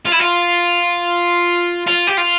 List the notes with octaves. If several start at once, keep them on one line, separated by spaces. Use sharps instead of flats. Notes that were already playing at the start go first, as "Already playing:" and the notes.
F4
E4
F4
F4
G4
F4